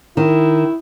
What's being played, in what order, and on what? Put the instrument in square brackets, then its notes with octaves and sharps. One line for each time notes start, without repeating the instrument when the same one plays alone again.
[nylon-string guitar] D#3 [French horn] E4